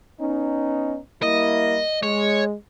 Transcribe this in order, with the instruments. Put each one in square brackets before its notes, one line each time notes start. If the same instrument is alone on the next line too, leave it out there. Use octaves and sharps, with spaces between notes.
[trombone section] B3 C#4 D#4
[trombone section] G3 A#3 E4 [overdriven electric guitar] D#5
[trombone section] G#3 [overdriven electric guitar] C#5